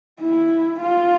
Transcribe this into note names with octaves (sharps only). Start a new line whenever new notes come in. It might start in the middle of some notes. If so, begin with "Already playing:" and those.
E4
F4